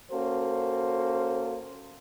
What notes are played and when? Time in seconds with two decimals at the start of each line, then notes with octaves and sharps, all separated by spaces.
0.11 A#3 C#4 F#4 A4 C5